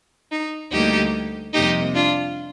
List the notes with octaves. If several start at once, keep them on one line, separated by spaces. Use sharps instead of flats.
D#4
D2 D3 G3 A#3 D#4 G4
F2 C3 G3 A#3 D#4 G4
D4 F4